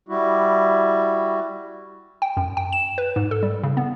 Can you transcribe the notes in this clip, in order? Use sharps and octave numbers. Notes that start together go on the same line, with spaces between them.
G3 E4 F#4
G5
F#2
G5
E7
B4
G#2
A4
G3
C#3
B3